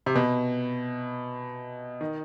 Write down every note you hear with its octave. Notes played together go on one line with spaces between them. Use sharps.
C3
B2
D#3